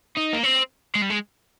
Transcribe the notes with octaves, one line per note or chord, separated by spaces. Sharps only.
D#4
A#3
C4
G#3
G3
G#3